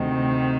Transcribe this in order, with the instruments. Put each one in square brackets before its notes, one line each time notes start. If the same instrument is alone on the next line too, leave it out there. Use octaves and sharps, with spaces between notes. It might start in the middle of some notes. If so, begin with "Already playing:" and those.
Already playing: [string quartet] D2 C3 D#3